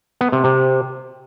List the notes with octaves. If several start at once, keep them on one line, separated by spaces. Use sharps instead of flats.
B3
C3
C3